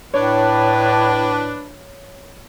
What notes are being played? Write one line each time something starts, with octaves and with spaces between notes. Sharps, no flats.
A2 D4 B4 C#5